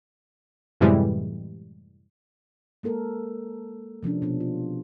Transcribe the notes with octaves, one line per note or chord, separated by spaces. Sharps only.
F#2 A2 C3 E3 G3 G#3
G#3 A#3 A4 A#4
C3 F3 C#4 D4
B2 B3 D4
F4